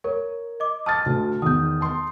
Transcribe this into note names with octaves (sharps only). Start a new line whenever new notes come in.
A#4 C#5
D#5 D6
A5 D#6 F6 A6
D2
E2 D#3 D#6 G6
A5 C6